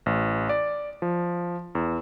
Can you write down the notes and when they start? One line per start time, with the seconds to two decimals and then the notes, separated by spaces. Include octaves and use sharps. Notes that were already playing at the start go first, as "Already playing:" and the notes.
0.06 A1
0.49 D5
1.02 F3
1.75 E2